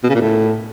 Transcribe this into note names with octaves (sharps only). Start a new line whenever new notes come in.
B2
C#3
A#2
A2